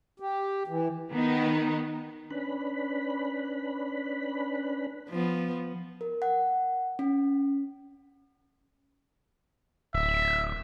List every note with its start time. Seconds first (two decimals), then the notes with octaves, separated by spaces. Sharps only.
0.20 G4
0.68 E3
1.12 D#3 B3 D#4
2.31 C#4 D4 B4 B5
5.09 F3 B3
6.01 A#4
6.22 F#5
6.99 C#4
9.95 D1 E5